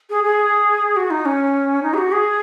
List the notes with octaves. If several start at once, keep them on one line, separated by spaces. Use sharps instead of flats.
G#4
G#4
F#4
D#4
C#4
D#4
G#4
F#4
G#4